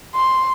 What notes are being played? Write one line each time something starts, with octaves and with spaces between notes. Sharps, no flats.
C6